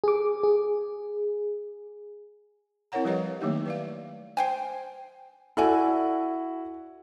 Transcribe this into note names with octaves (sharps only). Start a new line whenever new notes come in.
G#4 D6
G#4
C4 E4 A#4 C#5 F#5 A#5
F3 G3 G4 B4 C#5 D#5
D#3 F#3 A3 A#3 D#4 G4
B4 D5 F5
C5 G5 G#5
E4 F#4 A4 D5 G#5